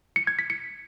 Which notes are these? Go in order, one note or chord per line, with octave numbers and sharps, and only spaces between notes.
C#7
G#6
B6
C#7